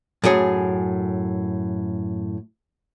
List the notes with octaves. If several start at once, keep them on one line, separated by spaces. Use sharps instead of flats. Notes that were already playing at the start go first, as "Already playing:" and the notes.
F#2 A2 G#4 C#5